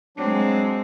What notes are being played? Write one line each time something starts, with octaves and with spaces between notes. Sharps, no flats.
F#3 G#3 C4 D4